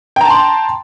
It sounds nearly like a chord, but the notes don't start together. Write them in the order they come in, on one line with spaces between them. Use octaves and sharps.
G5 A#5 A5 C6